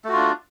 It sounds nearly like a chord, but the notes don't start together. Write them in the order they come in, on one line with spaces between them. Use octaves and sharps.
A3 F#4 F4 D4